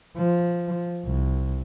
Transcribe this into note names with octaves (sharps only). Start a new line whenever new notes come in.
F3
C2